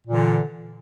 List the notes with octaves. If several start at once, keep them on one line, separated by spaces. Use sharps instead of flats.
A#2 D3 E3